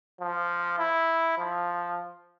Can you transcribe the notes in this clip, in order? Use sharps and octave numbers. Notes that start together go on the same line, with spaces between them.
F3
E4
F3